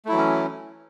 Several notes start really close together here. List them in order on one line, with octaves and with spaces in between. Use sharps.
A3 E4 F#3 E3 C#4